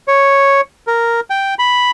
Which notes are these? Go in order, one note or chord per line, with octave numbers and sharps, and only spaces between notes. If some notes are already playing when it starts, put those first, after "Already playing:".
C#5
A#4
G5
B5